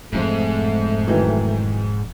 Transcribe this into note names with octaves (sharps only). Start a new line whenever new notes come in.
E1 F2 G#2 F3 A3
D#3 E3 F#3